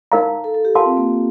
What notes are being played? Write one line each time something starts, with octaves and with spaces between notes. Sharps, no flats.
D#4 A#4 F5 A#5
A4
A4
G4
F4 A#4 F5 A5 C6
C4
A#3